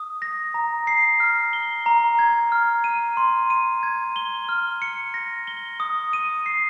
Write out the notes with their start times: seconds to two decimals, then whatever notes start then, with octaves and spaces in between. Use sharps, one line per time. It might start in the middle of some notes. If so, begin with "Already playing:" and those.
Already playing: D#6
0.22 A#6
0.54 A#5
0.87 C7
1.20 F6
1.53 G7
1.86 A#5
2.19 G#6
2.52 F6
2.84 D#7
3.17 C6
3.50 D#7
3.83 G#6
4.16 G7
4.49 F6
4.82 C#7
5.14 A#6
5.47 G7
5.80 D#6
6.13 D#7
6.46 C7